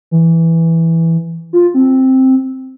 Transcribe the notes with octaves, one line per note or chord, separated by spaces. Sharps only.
E3
F4
C4